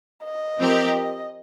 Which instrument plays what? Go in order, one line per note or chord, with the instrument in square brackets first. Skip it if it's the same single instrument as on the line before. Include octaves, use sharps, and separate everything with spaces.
[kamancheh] D#5
[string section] F3 C4 G4 A#4